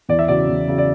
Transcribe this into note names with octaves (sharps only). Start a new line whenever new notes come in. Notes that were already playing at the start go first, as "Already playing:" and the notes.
E2 D5
E5
C#3 F#3 D5
E2
C#3 F#3
D5